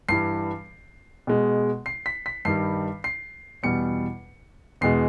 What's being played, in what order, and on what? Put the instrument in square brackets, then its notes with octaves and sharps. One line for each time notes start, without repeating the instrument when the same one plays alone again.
[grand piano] G2 E3 G3 C7
B2 G#3
C7
B6
B6
G2 D#3 G3 C7
C7
E2 B2 G3 C#7
E2 B2 G#3 C7